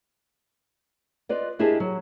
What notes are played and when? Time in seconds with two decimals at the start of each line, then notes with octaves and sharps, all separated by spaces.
1.29 F4 B4 D5 D#5
1.59 D4 E4 G4 G#4 A#4 D#5
1.80 F#3